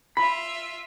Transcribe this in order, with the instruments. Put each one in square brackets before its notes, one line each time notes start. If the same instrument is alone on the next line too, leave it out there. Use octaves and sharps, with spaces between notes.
[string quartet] F4 E5 [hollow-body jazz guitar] B5